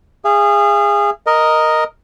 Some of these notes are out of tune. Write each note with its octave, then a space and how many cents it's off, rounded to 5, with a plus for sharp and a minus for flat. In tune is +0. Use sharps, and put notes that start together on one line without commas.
G#4 -20 F5 -40
A#4 +0 D#5 +0